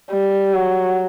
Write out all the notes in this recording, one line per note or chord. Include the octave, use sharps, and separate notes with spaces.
G3
F#3